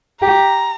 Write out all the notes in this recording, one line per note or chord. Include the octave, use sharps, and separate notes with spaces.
G4 A#5